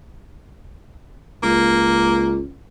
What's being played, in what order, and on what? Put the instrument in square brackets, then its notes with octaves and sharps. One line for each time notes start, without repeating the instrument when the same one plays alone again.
[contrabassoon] C#2 [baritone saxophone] A#3